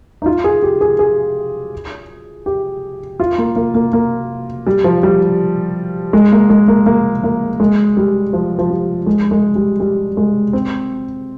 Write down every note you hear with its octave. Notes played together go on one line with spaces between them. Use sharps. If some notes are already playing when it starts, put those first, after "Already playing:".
D#4
F4
G#4
G4
G#4
G#4
G4
F4
A#3
A#3
A#3
A#3
G3
F3
G3
G#3
A#3
G#3
A#3
A#3
A#3
G#3
G3
F3
F3
G3
G#3
G#3
G3
G3
G#3
C4